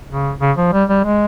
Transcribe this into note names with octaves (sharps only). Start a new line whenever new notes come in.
C#3
C#3
F3
G3
G3
G#3